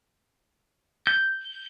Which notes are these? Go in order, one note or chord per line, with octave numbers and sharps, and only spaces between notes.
G6